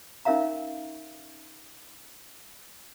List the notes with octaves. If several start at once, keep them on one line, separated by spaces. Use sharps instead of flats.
C#4 D#4 A#4 E5 F5 A#5